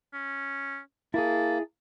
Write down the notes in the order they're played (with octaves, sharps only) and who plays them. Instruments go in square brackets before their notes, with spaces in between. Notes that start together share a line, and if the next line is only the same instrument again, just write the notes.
[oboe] C#4
[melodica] A#3 [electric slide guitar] E4 G#4 [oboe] A5